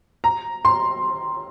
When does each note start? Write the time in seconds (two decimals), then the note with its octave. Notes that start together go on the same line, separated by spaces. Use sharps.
0.24 A#5
0.65 C6